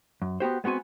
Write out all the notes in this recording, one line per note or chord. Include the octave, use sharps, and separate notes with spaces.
F#2
B3 F#4 G4 C5
G#3 B3 C4 F#4 G#5